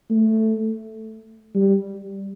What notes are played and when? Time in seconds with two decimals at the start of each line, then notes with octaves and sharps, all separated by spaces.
0.10 A3
1.55 G3